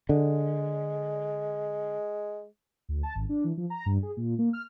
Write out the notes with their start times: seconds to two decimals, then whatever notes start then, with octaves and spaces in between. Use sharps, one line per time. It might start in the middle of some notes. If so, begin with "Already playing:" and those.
0.09 D3 G#3
2.89 D2
3.03 A5
3.15 G#1
3.29 D4
3.44 E3
3.57 F3
3.70 A#5
3.86 G2
4.03 G#4
4.17 A#2
4.39 A#3
4.53 F6